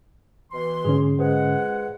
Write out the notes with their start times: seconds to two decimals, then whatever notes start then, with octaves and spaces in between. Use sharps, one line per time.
0.51 B2 E3 C6
0.85 G#2 D3 C#4 G#4
1.19 A#2 G#3 G#4 B4 C5 F#5